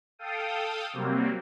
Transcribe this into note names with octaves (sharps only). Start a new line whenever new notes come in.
A4 F5 G5 D#6
C3 F#3 G3 A#3 C4